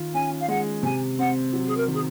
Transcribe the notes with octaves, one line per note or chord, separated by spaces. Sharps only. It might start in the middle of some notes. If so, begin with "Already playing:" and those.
Already playing: D#3 F4
C#4 G#5
F5
G#3 F#5
C3 G#5
C4 F#5
F#3
G#4
A#4
D#3
G#4